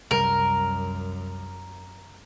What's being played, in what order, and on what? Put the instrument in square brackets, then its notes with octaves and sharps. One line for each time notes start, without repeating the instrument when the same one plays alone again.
[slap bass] C2 G3 [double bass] F#2 [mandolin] A#4